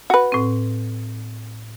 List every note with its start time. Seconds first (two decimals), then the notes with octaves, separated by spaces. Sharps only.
0.10 F#4 B4
0.32 A2 C4